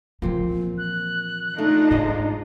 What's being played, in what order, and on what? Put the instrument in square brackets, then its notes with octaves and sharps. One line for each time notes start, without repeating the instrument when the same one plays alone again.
[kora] A#2 C4 [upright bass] E3 F3
[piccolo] F#6
[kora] A3 [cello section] D4 D#4 F4
[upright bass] G#2 [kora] G#4 C5 D#5